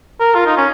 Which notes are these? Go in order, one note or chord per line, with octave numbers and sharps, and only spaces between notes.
A#4
F4
D#4
C#4